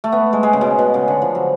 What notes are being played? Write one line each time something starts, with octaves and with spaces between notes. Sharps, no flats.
A3
B3
G#3
G#3
C#3
B2
B2
C#3
D3
F3
F#3